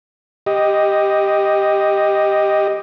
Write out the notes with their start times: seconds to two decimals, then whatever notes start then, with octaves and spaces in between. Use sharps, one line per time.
0.46 G4 D#5